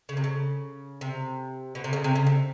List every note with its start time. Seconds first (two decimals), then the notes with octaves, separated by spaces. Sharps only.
0.09 C#3
0.17 C3
0.24 C#3
1.01 C3
1.75 B2
1.84 C3
1.93 C#3
2.04 C3
2.15 C#3
2.26 C3